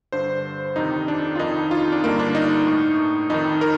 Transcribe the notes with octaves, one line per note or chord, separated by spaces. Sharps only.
G2 D3 C5
F2 C3 D#3 D#4
D4
F4
F2 D#3 D#4
F4
D4
G2 D3 A#3
D4
D#4
A2
F2 D#3 D#4
A#4